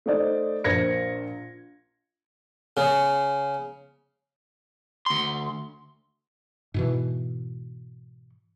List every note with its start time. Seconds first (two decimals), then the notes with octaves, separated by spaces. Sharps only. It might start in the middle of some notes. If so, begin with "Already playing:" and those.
0.06 A3 D#4 C5 D5
0.64 A#1 A#4 C5 G#6 A#6 C#7
2.77 C#3
5.06 D2 C6
6.74 G#2 B2 E3